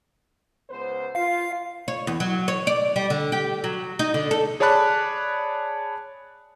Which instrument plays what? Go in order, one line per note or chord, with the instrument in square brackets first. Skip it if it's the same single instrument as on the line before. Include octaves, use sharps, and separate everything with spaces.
[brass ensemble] C#2 B3 C5
[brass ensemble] F4 [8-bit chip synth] F5 C7
[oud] C#5
E2
F#3
C#5
D5
G3
D3
G4
F#3
D#4
D3
A4
[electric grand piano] G#4 C#5 D5 A5 B5 F#6